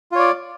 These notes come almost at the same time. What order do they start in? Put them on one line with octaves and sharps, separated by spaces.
F4 C#5 D5